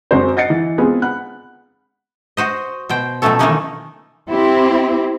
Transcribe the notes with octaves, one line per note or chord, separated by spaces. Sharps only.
F#2 G#3 C4 D4 F#4 C5
D#5 F#5 A6 C7 C#7
E3
G#3 B3 C4 F4 G#4 B4
F#5 B5 F#6
F#4 C5 D#5
B2 C5 G5
B2 F3 F#3 A3 C#4 A4
D#3 E3 A3 A#3 C#4 D#4
C4 E4 G4